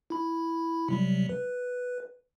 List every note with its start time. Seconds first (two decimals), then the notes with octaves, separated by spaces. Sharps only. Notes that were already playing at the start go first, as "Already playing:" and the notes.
0.10 E4 B5
0.88 C3 F#3 G3
1.29 B4